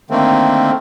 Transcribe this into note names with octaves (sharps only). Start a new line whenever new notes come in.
D3 D#3 A3 A#3 C4